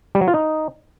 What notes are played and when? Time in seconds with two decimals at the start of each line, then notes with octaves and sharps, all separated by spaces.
0.15 G3
0.21 F#3
0.28 F4
0.34 D#4